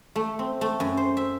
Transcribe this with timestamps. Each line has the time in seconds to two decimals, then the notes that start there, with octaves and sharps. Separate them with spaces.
0.16 A3
0.39 C4
0.61 A3
0.80 F#2
0.97 C5
1.17 E5